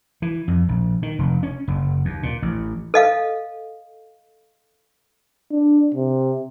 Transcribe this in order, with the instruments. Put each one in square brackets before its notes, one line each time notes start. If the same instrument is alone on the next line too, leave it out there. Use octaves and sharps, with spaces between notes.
[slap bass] E3
F2
A#1
D#3
F1
C#4
F#1
D#2
A#2
A1
[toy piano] A4 D#5 F5
[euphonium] D4
C3